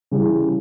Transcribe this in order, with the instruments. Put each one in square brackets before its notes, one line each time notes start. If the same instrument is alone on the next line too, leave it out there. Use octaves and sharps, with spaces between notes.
[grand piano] C#3 E3 G3